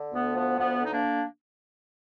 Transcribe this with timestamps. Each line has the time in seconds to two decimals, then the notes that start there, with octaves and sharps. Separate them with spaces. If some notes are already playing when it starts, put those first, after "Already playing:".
Already playing: D3
0.12 D2 B3
0.35 F3 B3
0.58 D2 B3
0.81 D3 D#4
0.91 A#3 D4